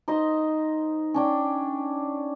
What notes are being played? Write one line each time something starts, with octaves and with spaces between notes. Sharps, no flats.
D#4 C5 D#5 C6
C#4 D4 G5